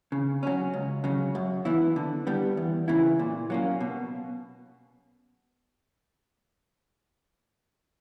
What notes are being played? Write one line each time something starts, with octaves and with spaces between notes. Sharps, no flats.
C#3
F#3 C#4
C#2
C#3 F#3
F#2
E3 B3 E4
D3
G3 B3
E2
C#3 E3 B3 E4
A#2
F#3 A#3 C#4
B2